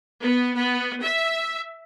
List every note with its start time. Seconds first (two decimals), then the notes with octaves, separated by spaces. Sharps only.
0.21 B3
0.56 B3
1.03 E5